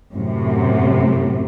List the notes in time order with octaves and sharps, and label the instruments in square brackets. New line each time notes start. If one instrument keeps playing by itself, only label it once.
[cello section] F#2 A2 C3